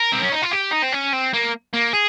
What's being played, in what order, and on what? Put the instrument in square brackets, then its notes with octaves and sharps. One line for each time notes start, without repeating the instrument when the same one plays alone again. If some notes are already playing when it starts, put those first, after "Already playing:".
Already playing: [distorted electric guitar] A#4
C4
C#4
D#4
F4
G4
D#4
C4
C#4
C4
A#3
A#3
G#4